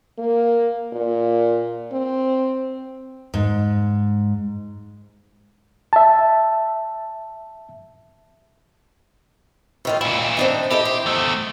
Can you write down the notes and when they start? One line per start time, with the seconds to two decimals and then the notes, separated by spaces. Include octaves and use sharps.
0.19 A#3
0.93 A#2
1.93 C4
3.34 G#2
5.93 E5 A5
9.85 A2 D#3 F4
10.01 A#2 C#4 E4
10.37 C4 D4 D#4
10.71 E4 G4 A4 D#5
10.85 C5
11.06 E2 A3